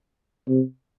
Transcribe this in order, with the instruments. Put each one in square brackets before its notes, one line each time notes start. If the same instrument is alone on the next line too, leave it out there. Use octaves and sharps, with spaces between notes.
[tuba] C3